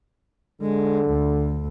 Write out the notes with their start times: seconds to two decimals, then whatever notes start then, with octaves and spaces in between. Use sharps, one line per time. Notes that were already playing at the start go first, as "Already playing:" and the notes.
0.62 D3 G#3
1.09 D2